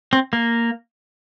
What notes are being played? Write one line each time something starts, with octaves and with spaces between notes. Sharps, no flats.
C4
A#3